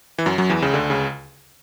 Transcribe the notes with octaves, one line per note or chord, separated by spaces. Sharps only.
E3
F#2 F#3
F#2 F#3
E2 E3
C#2 C#3
D2 D3
C#2 C#3